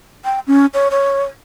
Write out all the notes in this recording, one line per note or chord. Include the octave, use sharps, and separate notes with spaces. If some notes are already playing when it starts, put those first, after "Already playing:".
G5
C#4
C#5
C#5